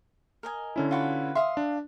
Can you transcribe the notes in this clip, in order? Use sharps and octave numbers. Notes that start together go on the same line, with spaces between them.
A#4 D#5 G#5
D3 C#4 E4
F4 F#4 B4
E5 F5 C6 D#6
D4